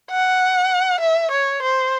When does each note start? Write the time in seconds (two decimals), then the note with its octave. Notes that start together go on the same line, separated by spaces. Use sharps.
0.11 F#5
1.01 E5
1.31 C#5
1.62 C5